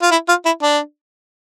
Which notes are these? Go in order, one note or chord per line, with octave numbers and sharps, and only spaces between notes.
F4
E4
F4
E4
D4